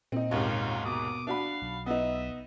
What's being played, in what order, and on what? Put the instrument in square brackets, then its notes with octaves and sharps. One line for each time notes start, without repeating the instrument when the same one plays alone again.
[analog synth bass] A#2 [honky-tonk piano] C4 D#4
[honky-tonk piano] D#2 G#2 C3 [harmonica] D#3 C#4 F4
[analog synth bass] B2 [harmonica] D6 D#6
[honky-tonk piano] D4 F#4 B5 [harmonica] F5
[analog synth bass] B1
[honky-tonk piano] B3 D#4 [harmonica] D#5 E5